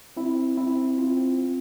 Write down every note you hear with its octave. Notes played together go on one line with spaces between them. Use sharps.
C4 E4
C4 E4
C4 F4
C4